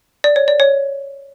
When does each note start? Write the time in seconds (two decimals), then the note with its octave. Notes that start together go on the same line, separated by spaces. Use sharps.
0.24 D5
0.36 C#5
0.48 D5
0.60 C#5